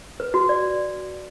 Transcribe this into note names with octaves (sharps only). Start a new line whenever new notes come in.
B4
F#4
D5